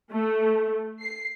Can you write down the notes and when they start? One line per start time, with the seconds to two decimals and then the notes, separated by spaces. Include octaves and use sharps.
0.12 A3
1.00 C7